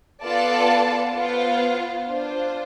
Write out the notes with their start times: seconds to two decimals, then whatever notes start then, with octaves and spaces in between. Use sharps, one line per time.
0.24 B3 F4 A4 D5 A5
1.14 B3 F4 C5 F5
2.04 D4 F4 C5